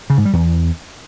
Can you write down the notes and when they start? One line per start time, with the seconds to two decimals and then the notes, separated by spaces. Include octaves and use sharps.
0.10 C#3
0.18 G#2
0.25 G3
0.33 E2